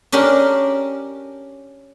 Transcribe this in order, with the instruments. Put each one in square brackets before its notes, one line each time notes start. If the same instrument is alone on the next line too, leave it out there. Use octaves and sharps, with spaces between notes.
[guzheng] C#4 D4 G4 A#4